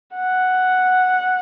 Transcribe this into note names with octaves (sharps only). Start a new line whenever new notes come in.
F#5